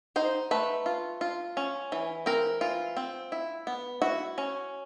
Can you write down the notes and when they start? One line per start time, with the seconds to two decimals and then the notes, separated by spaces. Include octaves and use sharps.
0.16 D#4 C5
0.51 A3 B4
0.86 F4
1.21 F4
1.57 C#4
1.92 E3
2.26 C4 A#4
2.61 E3 F4
2.97 C4
3.32 E4
3.67 B3
4.02 E4 F#4
4.38 C#4